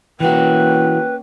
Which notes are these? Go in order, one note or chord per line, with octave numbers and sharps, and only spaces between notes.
E3 A#3 C#4 F#4 B4 G5